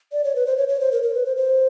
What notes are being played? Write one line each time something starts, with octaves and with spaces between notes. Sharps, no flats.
D5
C#5
B4
C5
C#5
C#5
C5
A#4
A#4
B4
C5
C5